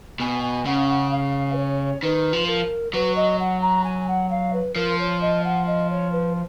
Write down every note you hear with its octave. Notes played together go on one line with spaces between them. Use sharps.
B2 G#5
G#5
C#3 F#5
F#5
F5
B4
C#5
D#3 B4
F3
A#4
F#3 B4
D#5
F#5
A#5
G#5
F#5
F5
B4
F3 A#4
C#5
D#5
F#5
D#5
C#5
B4